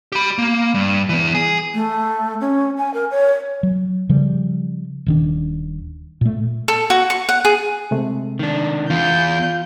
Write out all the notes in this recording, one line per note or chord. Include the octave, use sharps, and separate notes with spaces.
G4 B5
A#3
G2
E3 B3
G#4
A3
C#4
G#5
A#4
C#5
F#3
C#3 F3 G3
D#1 D#3 D4
A#2 A3
A4
F#4
C#6
F#5
G#4
C3 G#3 A3
D#3 D4
E2 F4 G6